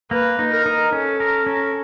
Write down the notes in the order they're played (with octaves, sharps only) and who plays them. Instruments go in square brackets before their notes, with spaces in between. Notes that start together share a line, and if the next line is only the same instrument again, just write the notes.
[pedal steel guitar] A#3 [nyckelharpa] B4
[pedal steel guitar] D#4
[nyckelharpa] A#4
[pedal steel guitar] D#4
[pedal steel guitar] C#4 [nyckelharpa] A4
[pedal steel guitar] A#4
C#4